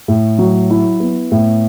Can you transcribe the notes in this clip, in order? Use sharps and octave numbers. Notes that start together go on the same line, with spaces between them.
A2
F#3
E4
B3
A2